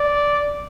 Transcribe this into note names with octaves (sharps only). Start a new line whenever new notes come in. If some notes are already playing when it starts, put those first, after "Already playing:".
Already playing: D5